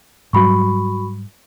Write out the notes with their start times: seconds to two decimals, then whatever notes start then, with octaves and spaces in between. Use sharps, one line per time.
0.33 G#2 F#3 G3 F#4 B5 C#6